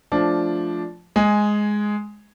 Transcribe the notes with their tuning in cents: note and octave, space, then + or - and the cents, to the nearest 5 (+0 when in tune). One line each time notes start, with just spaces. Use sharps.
F3 +0 A3 -15 D4 +0
G#3 +5 G#5 +0